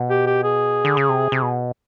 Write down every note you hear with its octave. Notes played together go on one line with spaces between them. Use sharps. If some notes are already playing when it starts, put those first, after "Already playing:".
Already playing: B2
G4
G4
G#4
D3
C#3
C3
C3
B2